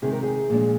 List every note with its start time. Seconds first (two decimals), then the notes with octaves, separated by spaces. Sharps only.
0.02 C3 D#3 G#3 G#4
0.13 A#4
0.23 G#4
0.50 A#2 F3 G#3 D4